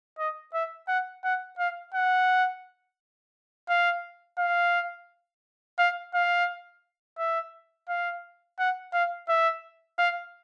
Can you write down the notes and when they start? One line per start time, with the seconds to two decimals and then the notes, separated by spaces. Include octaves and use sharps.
0.19 D#5
0.54 E5
0.88 F#5
1.24 F#5
1.59 F5
1.95 F#5
3.69 F5
4.38 F5
5.79 F5
6.14 F5
7.18 E5
7.89 F5
8.59 F#5
8.93 F5
9.29 E5
9.98 F5